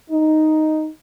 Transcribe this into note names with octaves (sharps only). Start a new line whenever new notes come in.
D#4